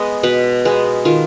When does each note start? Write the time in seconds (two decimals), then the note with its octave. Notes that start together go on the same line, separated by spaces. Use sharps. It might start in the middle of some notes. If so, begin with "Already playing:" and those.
Already playing: G#3 B3 D#5
0.23 B2 B4
0.65 G#3 B3
1.05 D#3 F4